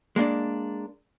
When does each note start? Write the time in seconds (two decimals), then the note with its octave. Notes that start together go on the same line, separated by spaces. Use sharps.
0.16 G#3 A#3 C#4 D4